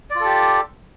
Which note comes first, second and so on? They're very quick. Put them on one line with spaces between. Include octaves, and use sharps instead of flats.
D5 F4 A4 G4